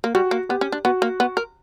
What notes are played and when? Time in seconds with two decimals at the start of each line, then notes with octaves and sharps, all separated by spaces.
0.04 A#3
0.15 G3 F#4
0.31 A#3
0.49 B3 G4
0.61 C#4
0.72 D4
0.85 B3 F#4
1.02 A#3
1.20 B3
1.37 A#4